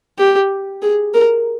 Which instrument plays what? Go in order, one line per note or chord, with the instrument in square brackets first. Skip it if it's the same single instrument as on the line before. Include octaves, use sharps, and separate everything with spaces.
[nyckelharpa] G4
G#4
A#4